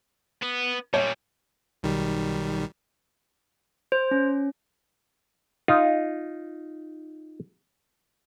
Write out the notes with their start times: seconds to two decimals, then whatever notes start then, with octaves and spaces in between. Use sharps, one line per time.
0.42 B3
0.94 A#2 G3 C#5
1.83 B1 D#3 G3
3.92 C5
4.11 C#4
5.68 D#4 F4